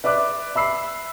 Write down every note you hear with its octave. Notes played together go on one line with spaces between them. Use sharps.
B4 D5 E5 D6 F#6
E5 B5 E6 C7